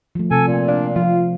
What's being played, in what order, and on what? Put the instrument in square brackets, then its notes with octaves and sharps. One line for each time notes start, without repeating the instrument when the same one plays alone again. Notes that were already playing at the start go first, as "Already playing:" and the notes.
[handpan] F3 A3
[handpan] C3 [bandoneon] A4 G#5
[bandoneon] A#2
[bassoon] D4 [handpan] F5
[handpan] F3 [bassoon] F4